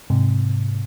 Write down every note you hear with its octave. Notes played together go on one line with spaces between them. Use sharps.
G#2 C3